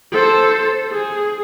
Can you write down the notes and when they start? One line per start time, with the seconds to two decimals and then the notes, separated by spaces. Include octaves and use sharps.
0.12 A4 C5
0.92 G#4